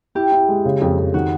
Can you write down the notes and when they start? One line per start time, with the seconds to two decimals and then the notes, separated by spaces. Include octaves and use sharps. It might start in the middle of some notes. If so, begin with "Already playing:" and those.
0.15 E4 G4
0.32 E4
0.48 G#3
0.65 C#3
0.82 F2
0.99 F2
1.14 D#3 F#4